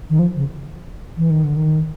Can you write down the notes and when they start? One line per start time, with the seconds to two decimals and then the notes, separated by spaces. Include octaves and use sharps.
0.10 D#3
0.19 F3
0.36 C#3
1.17 E3
1.30 D#3
1.44 D3
1.56 D#3